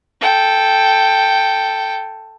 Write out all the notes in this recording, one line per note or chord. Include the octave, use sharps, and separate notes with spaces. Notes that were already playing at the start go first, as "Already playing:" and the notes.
A4 G5